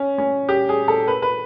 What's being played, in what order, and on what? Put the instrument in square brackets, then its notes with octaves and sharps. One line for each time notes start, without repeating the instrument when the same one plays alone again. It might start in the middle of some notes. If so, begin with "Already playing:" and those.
Already playing: [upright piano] C#4
C#4
G4
G#4
A4
B4
B4